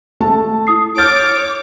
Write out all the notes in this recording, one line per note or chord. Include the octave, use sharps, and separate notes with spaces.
A3 A5
E4 D#6 C7
C#5 D6 F6 G6 A6